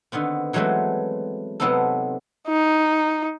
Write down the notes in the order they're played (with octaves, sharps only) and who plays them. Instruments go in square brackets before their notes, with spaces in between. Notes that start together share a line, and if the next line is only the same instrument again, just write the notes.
[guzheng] D3 D#3 B3 C4
E3 F#3 G#3 A3 B3 C4
C3 F#3 B3 C4 D#4 A4
[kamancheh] D#4